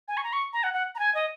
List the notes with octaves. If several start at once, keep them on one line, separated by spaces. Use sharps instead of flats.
G#5
C#6
A#5
C#6
A#5
F#5
F#5
A#5
G#5
D#5